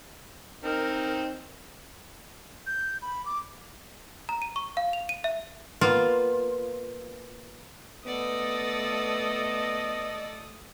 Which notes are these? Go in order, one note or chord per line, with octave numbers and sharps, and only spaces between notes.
C4 D#4 A#4
G6
B5
D6
A#5
D#7
C#6
F5
F7
D#7
E5
A#3 B3 F4
A3 B3 A4 D5 D#5 D#6